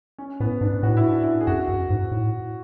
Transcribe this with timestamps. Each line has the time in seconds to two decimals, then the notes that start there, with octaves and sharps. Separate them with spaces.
0.18 C#4
0.40 A2 B3
0.61 G#2 D4
0.83 A2 F#4
0.97 E4
1.10 D4
1.23 E4
1.41 G#4
1.47 F#2 F#4
1.69 F#2
1.90 G#2
2.12 A2